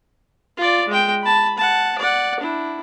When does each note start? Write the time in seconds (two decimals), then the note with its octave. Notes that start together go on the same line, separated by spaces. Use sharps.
0.57 F4 D5
0.89 G#3 G5
1.22 A5 B5
1.58 F#5 A5
1.98 D5 F#5
2.40 D4 E4